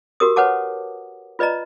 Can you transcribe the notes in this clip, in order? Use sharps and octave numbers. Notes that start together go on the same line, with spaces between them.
F#4 G4 A#4 D#6
B4 C#5 F#5 A5 D6
F4 B4 D5 D#5 A#5